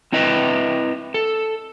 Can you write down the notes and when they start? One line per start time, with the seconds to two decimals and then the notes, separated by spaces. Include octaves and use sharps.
0.12 C4 E4 B4 D#5 E5 G5
1.14 A4